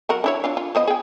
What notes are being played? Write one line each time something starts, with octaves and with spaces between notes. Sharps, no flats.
F#3 F#4 A#4
D4 E4 C#5
D4 F4 F5
F4
F3 B3 D#5
G#4 G5